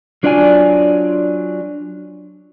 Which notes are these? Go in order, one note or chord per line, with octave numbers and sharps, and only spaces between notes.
F#3 D4 F4 D5 F#5 G#5